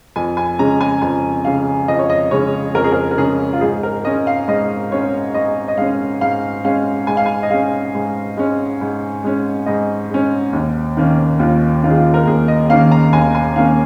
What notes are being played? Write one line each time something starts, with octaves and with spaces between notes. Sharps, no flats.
F2 G#5
G#5
C#3 G#3 C#4 A#5
G#5
F2 G#5
C#3 G#3 C#4 F5
F2 D#5
C#5
D#5
C#3 G#3 C#4 C#5
F2 A#4
G#4
A#4
A#4
C#3 G#3 C#4 G#4
F4
G#2 G#4
A#4
G#3 C#4 D#5
F5
G#2 D#5
G#3 C#4 C#5
G#2 D#5
D#5
G#3 C#4 F5
G#2 F5
G#3 C#4 F5
G#2 G#5
F5
G#5
D#5
G#3 C#4 F5
G#2
G#3 C#4
G#2
G#3 C#4
G#2 D#5
G#3 C#4
D#2
D#3 A#3 C#4
D#2 F4
D#3 A#3 C#4 F4
G#4
F4
A#4
D#2 G#4
D#5
D#3 A#3 C#4 F5
A#5
D#2 G#5
G#5
D#3 A#3 C#4 F5